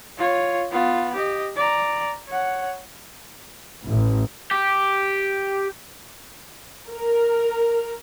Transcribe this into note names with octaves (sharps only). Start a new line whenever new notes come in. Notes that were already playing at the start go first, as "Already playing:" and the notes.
F4 C#5
B3 F4
G4 D#5
D5 A#5
C#5 F#5
A1
G4
A#4